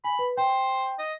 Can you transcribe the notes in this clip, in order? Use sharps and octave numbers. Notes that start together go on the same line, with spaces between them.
G#5 B5
B4
C5 G5
D#5